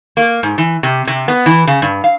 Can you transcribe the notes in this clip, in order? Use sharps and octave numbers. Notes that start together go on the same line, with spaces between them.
A#3
G#2
E3
C3
C3
B3
E3
C#3
G2
F5